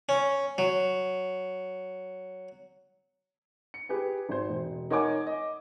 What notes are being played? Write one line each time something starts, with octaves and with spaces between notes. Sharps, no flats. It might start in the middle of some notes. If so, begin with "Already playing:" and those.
C#4
F#3
C#7
G4 G#4 B4 G#5
G#1 C5
E1
D#4 A#4 C#5 F#5 G#5 D6
D#5